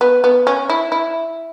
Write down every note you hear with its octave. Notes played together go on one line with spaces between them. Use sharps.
B3
B3
C#4
E4
E4